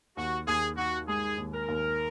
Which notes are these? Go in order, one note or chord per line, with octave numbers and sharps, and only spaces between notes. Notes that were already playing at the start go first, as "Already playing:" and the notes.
D#2 F#4
D#2 G#4
D#3 F#4
G#3 G#4
D#2
A#4
D#2